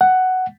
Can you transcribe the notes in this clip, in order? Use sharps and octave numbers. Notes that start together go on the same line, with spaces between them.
F#5